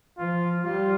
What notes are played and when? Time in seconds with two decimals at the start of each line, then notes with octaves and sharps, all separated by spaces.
0.18 F3 F4
0.64 G3 F4